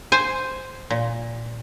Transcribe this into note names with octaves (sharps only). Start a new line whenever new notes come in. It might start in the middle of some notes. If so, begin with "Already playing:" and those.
C5 G#5
A#2